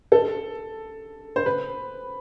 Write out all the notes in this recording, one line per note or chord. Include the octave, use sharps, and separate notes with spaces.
A4
C5
B4